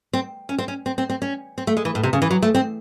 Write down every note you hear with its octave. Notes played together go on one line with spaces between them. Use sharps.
C4
C#4
C4
C#4
C4
C4
C4
C#4
C4
A3
G#3
E3
A2
C3
C#3
E3
F#3
A3
C4